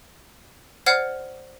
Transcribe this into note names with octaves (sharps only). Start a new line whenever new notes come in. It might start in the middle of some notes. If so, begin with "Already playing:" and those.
C5 D5 F#5 F6 G#6 C7